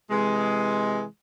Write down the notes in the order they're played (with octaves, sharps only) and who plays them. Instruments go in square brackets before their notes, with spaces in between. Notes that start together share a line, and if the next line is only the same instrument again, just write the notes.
[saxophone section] C3 E3 G#3